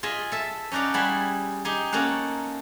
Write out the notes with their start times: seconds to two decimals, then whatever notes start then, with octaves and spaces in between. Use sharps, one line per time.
0.03 F4 G#4 D#5 E5
0.32 A4 E5
0.72 C#4 D#4 F#4 D5 F5
0.94 G3 E4 G#4 F#5 B5
1.65 D#4 G4 G#4
1.92 A#3 C#4 A4 F5 F#5